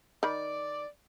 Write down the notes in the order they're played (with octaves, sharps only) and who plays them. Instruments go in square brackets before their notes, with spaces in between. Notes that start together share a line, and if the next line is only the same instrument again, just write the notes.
[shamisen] D#3 B5 [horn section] D5